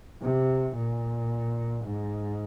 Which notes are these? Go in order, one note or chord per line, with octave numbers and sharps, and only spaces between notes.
C3
A#2
G#2